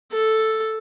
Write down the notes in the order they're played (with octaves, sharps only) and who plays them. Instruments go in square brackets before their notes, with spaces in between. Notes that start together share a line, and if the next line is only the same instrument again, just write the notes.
[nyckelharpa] A4